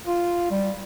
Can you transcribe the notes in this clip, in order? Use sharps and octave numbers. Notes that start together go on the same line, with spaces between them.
F4
G3